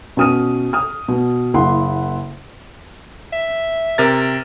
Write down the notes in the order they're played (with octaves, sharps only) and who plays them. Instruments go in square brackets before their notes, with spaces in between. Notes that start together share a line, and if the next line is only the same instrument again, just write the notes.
[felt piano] B2 C#4 D#6 F6 D#7
D#6 F6
B2
F#1 A#3 E4 F#5 C6
[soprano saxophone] E5
[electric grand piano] C3 A#4 A6